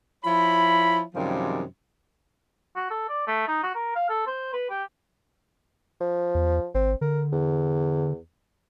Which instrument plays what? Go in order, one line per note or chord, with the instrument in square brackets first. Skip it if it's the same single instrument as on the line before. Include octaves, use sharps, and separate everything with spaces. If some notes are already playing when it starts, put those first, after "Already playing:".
[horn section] F3 E4 C#5 B5
F#2 C3 D#3 F3 G3 G#3
[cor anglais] F#4
A4
D5
A3
D#4
F#4
A#4
F5
A4
C5
B4
G4
[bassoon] F3
[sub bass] E2
[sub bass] G#1 [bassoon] C4
[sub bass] D3 [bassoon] A#4
[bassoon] E2